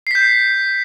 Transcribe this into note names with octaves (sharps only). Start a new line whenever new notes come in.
G6 B6 C7